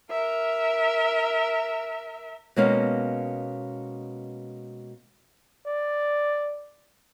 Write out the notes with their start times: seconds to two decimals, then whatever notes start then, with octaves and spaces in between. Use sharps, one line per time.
0.11 A#4 E5
2.56 B2 G#3 A#3 C#4 F5
5.66 D5